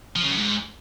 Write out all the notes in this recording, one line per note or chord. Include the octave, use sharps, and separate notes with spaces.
F3
C#3
F#2
G#2